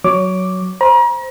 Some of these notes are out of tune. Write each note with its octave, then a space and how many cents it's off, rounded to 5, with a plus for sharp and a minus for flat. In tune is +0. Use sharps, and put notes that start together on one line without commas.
F#3 +0 C#5 +15 D6 +0
C5 +0 A#5 +40